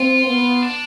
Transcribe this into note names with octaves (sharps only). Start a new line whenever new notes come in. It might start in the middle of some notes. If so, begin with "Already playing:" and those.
Already playing: C4 F4
B3
D4